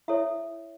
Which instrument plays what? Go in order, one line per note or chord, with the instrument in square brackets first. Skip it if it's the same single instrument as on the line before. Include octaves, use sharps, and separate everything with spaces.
[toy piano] E4 A4 C#5 E5